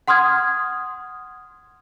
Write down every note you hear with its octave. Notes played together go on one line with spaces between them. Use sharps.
F#5 C6 D#6 F6 G#6